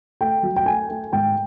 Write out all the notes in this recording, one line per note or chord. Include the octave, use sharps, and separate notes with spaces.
A3 G5
F#3
G5
A3 G#5
A3
G#2 G5